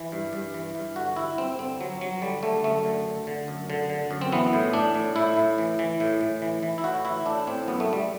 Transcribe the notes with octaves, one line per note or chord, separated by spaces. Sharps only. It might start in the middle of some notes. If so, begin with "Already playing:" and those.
Already playing: E3
G2
G2
E3
G2
D3 F#4
G2 E4
G2 C4
D3 C4
G2 F#3
G2 F#3
D3 G3
D3 A3
F#2 A3
D3
D3
D3
F#2
D3
D3
F#2
C4
E3 B3
A2
A2 D4
A2
A2 E4
A2
E3
E3
A2
A2
E3
E3
E4
A2 F#4
E3 E4
A2 D4
A2 C4
F#2 B3
A3
F#2 G3